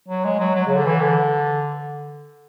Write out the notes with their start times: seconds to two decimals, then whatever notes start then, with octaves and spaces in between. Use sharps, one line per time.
0.08 F#3
0.25 G#3
0.40 F#3
0.55 F#3
0.67 C#3
0.76 D3
0.86 E3
1.01 D3